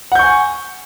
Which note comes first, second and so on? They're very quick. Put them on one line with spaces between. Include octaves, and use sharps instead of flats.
F#5 G6 C#6 G#5